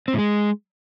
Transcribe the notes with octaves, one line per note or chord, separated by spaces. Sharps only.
C4
A2
G#3